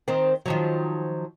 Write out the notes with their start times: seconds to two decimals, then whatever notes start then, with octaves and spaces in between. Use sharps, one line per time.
0.08 D#3 C4
0.46 D#3 F3 F#3